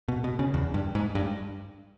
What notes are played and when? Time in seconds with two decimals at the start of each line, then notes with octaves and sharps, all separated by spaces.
0.08 B2
0.24 B2
0.39 C#3
0.54 E2
0.74 G2
0.95 G#2
1.15 G2